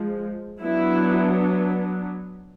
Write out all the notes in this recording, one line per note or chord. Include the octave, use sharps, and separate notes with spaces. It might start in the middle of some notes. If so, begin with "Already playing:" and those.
Already playing: F3 G#3
F#3 B3 D4 E4